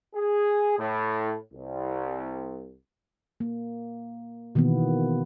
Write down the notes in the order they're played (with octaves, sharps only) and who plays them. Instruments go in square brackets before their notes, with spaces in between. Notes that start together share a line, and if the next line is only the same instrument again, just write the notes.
[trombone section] G#4
A2
C2
[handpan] A#3
B2 D#3 E3 A#3 B3